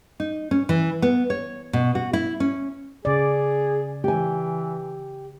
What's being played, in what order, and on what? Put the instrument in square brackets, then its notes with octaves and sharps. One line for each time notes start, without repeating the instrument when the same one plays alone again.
[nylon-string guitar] D#4
C#4
E3
B3
C#5
B2
F#4
E4
C#4
[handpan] C#3 D5 [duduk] G#4
[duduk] E3 [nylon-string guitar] G4 G#5